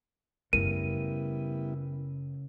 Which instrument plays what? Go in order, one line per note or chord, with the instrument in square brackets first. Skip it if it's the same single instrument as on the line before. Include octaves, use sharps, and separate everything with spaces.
[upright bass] F#2 A3 [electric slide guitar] C#3 A#4 [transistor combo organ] G3 B3 E4 [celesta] D#7